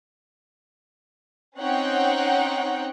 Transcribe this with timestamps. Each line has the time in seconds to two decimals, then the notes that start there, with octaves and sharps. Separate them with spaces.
1.57 C4 C#4 D#4 C#5 F#5 G5